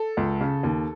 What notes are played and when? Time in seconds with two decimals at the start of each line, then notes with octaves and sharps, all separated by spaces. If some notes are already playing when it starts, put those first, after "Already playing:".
Already playing: A4
0.17 C#2
0.41 C#3
0.63 D#2